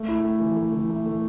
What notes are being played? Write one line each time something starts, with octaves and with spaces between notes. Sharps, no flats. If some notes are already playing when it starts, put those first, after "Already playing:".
Already playing: A3
E4
A3
E3
A3
E3
A3
A3